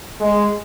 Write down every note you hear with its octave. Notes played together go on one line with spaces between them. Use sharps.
G#3